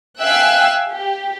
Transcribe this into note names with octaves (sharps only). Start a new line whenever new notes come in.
E5 F5 G5 G#5 E6 F#6
G4